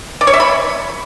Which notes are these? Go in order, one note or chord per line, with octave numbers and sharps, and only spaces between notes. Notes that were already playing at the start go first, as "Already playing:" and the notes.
D5
C#5
E5
B5